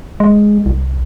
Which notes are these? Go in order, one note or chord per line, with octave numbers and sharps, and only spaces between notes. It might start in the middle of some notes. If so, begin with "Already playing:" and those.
G#3
C2